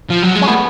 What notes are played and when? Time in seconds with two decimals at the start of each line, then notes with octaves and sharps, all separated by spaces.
0.10 F3
0.23 F#3
0.35 G#3
0.41 C#4
0.48 A3 B3